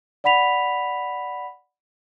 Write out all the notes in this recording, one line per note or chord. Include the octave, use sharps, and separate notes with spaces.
D5 F#5 B5 B6 F7